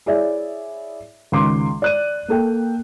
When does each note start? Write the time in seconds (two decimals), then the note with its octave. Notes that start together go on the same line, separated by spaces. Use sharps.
0.06 E4 G#4 C#5 D5 E5
1.32 C#2 D#3 C6 D6
1.82 D5 F#6 D#7
2.28 A#3 A4 G5